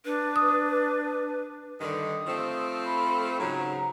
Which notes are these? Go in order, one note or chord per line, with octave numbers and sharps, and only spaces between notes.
D4 B4
D#6
G2 D3 D#3 D#6
F3 A3 C4
B5
G#2 C#3 F#3 A#5